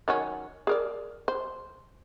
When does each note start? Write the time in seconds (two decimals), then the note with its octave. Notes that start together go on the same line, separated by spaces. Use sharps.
0.08 D#3 F#3 C#4
0.67 G#4 A#4 D5
1.28 C5